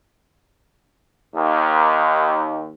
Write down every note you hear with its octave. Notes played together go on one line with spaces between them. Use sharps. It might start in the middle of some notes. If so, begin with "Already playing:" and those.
D#2